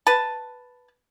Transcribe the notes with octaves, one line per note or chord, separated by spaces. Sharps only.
B4 A5